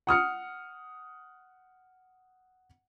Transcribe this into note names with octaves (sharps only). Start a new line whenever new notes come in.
F#5 D#6 F6 C#7